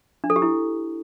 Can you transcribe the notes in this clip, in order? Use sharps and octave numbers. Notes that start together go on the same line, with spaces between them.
D4
A4
G4
E4